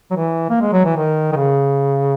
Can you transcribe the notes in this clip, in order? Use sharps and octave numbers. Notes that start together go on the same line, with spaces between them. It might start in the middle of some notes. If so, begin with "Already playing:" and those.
F#3
E3
A#3
G#3
F#3
E3
D#3
D#3
C#3